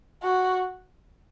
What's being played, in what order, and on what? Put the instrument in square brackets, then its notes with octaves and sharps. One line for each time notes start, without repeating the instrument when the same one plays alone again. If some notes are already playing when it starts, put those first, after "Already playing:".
[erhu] F#4